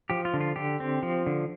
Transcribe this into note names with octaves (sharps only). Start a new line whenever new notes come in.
F3 G4
F4
D3
F4
D3 G4
C4
F3
D3